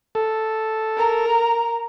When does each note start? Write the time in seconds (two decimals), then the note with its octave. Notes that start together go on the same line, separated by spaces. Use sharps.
0.15 A4
0.97 A#4 A#5